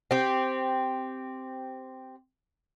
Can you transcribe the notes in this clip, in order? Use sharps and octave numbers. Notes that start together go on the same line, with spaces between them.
C4 G4